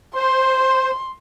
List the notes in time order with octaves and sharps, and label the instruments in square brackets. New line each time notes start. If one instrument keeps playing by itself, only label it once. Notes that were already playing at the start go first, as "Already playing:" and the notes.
[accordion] C5 [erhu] C6